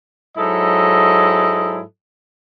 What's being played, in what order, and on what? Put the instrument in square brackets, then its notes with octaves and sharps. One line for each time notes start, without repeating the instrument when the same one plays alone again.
[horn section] G#2 F#3 E4 A4 D#5